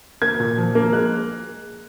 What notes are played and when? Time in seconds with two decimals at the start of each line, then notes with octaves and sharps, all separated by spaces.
0.22 A#3 G#6
0.40 A#2
0.57 F3
0.75 A#3
0.93 G#3 F#6